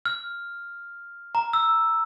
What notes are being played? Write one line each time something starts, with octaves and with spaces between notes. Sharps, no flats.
F6
A#5
E6